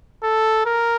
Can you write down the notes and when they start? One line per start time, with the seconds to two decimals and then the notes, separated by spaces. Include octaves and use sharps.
0.23 A4
0.66 A#4